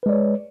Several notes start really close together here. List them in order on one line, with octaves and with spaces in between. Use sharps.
B4 G#3 D5 C#5